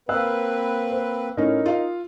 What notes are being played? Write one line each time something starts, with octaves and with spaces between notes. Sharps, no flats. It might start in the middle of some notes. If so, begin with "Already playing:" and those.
A#3 C4 B4 F5 E6 F#6
C5
A2 C#4 D#4 A#4
F4 F5